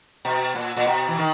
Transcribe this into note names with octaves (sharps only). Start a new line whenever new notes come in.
B2
A#2
A#2
B2
E3
D#3